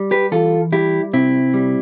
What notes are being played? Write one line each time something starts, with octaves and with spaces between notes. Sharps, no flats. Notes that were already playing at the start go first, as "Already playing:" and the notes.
Already playing: G3
G4 B4
E3 F4 A4
G3 E4 G4
C3 C4 E4
G3